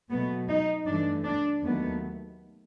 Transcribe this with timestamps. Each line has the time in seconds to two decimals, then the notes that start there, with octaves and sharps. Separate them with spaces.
0.11 B2 F#3 A3 B3
0.48 D#4
0.86 G2 E3 A3 D4
1.24 D4
1.62 D#2 D#3 F#3 A3 B3